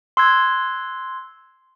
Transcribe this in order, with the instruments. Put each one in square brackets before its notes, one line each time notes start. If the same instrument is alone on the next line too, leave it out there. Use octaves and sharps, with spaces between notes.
[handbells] C6 E6 F#6 G#6